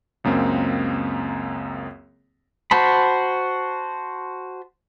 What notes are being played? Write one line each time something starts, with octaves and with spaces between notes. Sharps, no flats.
C#2 F#2 A#3 C4
F#4 C5 A5 B5